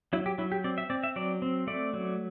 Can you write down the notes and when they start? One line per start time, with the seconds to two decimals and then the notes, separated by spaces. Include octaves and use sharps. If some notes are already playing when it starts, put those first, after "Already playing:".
0.13 F#3 E4
0.26 G4
0.38 F#3 E4
0.52 G4
0.64 C4 D5
0.78 E5
0.90 C4 D5
1.03 E5
1.16 F#3 D5
1.42 C4
1.67 A3 D5
1.93 F#3